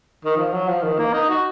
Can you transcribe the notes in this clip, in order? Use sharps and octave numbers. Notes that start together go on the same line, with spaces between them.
D#3
F3
F#3
F3
D#3
A#3
D#4
F#4